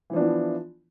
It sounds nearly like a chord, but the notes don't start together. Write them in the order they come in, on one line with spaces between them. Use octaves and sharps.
E3 F3 D4 B3 E4